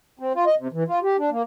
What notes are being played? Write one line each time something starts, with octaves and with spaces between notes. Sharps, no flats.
C4
F4
D#5
C3
E3
F4
G4
D4
A#3